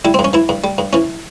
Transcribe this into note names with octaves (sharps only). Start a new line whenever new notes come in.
G3 E4
C4
G2
C#4
E3 E4
G2
G3
G2
E3 C#4